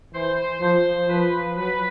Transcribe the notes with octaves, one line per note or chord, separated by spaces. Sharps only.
E3 C5
F3 C5
F3 B4
F#3 B4